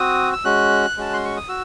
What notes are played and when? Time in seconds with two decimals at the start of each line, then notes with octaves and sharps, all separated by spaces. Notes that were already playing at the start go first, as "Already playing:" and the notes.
Already playing: C4 F#4 D#6
0.33 E6
0.44 G#3 C#4 F#4 F#6
0.97 G#3 C#4 F#4 A5
1.13 C6
1.25 C#6
1.37 D#6
1.48 F#4 E6